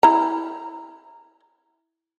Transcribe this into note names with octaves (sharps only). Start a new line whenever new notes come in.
E4 A#5